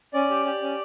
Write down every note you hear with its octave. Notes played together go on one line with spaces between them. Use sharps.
C#4 D5
G4
G4
C#4